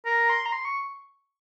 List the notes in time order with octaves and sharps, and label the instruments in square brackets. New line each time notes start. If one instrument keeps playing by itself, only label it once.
[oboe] A#4
[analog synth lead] A#5
C6
A#5
C6
C#6